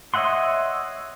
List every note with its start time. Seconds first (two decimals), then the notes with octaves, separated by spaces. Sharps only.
0.14 C#5 D#5 E5 F#5 C6